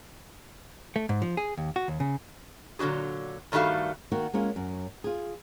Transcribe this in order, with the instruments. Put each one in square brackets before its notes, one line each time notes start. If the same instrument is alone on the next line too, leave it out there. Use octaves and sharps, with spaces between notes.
[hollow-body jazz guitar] A3
G#2
F3
G#4
D#2
F#4
D#2
C#3
[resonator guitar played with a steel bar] A#2 D3 F#3 F#4 G#4
G2 D#3 G3 A3 F#4 F5
[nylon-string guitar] D#3 A#3 F#4
G#3 A#3 C#4 F4
F#2
F4 G#4